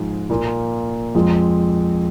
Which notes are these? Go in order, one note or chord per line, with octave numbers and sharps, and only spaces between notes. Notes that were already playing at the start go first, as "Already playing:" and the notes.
Already playing: G#2 F3 G#3 D#4
A#2 A#3 F4
F2 F3 G#3 F4